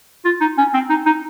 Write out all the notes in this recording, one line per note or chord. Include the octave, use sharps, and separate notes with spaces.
F4
D#4
C#4
C4
D#4
D#4